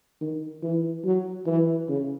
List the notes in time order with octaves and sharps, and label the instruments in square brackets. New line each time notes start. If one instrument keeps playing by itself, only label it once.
[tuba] D#3
E3
F#3
E3
C#3